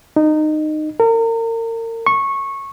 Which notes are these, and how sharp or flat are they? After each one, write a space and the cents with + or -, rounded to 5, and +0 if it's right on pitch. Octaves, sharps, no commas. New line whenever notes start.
D#4 -20
A#4 -35
C#6 -15